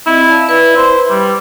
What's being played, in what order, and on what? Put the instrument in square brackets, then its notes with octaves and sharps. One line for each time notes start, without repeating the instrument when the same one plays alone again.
[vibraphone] C4 D#5 [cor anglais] E4
[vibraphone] D5 F5 A5
[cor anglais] E4 [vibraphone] B4
[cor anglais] C5
G3